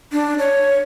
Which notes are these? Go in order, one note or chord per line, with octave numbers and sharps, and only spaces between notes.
D4
C#5